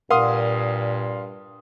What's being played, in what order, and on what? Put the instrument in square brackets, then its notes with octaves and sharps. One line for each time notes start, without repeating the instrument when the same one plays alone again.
[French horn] G2 [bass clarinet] A#2 [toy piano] A#4 F#5 [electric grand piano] F5 C6 D#6